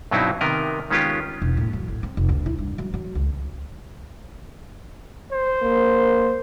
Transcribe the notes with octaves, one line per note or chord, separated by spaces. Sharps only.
G2 B2 F#3 C4 D#4 E4
C3 D#3 B3 A#4 D#5
D#3 G#3 B3 C#4 F4 G4
E1
A2
F#3
A1
C4
F1
D2
E4
G2
F#3
F#3
C#2
C5
A#3